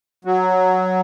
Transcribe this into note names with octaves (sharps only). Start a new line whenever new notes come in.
F#3